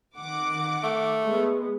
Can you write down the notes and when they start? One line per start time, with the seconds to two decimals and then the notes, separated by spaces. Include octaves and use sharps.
0.18 D#3 F#5 D6
0.83 A3
1.25 G#3 B3